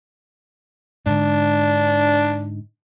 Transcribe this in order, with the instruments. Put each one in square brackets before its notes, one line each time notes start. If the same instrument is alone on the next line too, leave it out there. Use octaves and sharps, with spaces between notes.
[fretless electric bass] G#2 D3 [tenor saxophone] D4